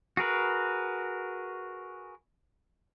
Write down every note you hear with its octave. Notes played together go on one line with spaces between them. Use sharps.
F#4 G#4 A#4 B4